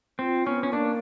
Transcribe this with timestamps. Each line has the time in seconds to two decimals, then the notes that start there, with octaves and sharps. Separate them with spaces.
0.19 C4 F4
0.46 B3 C#4
0.63 C#4
0.72 A#3 D4